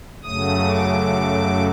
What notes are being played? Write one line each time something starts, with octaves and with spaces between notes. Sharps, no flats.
F#2 C#3 F#3 A3 D#6
D6